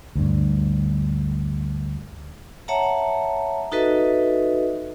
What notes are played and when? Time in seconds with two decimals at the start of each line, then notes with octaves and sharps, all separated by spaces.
0.16 D2 G2
2.68 C#5 E5 F#5 A5 A#5
3.72 D#4 F#4 A4 B4 D#5 E5